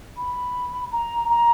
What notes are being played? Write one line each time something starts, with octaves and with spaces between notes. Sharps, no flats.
B5
A#5
A#5